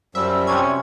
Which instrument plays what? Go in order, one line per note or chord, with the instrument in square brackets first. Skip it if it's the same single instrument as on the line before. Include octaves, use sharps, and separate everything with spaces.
[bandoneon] F#2 F3 G3 [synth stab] E5
[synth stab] C3 G#6 [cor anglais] C#4